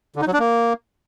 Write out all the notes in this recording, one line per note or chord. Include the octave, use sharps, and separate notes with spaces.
D3
D#4
F#3
D4
A#3